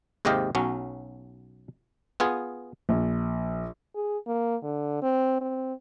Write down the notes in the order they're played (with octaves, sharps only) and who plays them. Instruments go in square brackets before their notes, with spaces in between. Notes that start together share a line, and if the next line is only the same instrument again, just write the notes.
[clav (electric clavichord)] D#2 G#2 C3 G4 D#5 F5
B1 F#3 C#4
B3 F4 G#4
[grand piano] A#1
[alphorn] G#4
A#3
D3
C4
C4